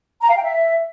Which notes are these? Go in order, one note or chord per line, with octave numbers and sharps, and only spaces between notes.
A#5
F5
G5
E5